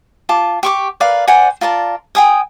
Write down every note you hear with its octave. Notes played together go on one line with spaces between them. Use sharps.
F4 A5 D6
G4 C#6 D6
A#4 B4 D5 F5
C5 D5 F#5 G#5
F4 A#4 D5 A5
G5 G#5 D#6